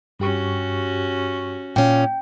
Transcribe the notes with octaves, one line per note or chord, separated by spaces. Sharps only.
G2 C#4 F#4 G4 C#6
A#2 C#4 G5